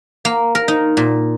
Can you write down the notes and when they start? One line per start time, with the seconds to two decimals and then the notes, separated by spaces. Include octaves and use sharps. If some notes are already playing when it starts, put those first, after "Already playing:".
0.25 A#3
0.55 A#4
0.68 D#4
0.97 A#2